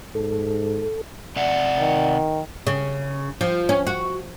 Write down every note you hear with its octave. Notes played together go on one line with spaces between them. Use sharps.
G#2 A4
C3 D5 E5 F#5
D#3
C#3
F3
C#4
F#4